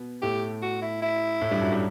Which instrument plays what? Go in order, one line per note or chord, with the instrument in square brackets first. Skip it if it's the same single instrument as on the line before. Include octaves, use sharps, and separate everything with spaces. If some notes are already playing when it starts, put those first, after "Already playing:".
Already playing: [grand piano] B2 B3
[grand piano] A2 A3 [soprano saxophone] G4
[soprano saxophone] F#4
E4
E4
[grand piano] A2 A3
G2 G3
F#2 F#3
G3